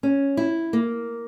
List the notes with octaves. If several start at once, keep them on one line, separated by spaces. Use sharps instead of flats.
C#4
E4
A#3